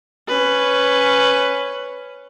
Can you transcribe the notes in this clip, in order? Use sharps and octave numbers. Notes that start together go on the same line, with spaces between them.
C#4 B4